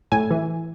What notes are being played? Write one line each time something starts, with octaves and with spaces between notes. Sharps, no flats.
A2 G#5
E3